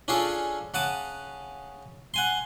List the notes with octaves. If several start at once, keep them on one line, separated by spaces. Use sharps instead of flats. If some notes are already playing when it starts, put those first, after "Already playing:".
C#4 D4 F4 G#4 A4 D5
C#3 F#5 A5 D6 D#6
F#5 G#5 C6